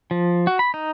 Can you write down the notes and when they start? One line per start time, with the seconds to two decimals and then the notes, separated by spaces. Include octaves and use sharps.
0.11 F3
0.47 F#4
0.59 B5
0.74 D#4